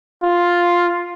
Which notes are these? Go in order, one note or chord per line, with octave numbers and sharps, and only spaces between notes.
F4